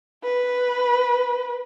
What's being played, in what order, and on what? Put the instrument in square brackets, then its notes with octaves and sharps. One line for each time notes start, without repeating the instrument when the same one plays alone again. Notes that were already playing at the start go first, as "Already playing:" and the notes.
[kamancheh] B4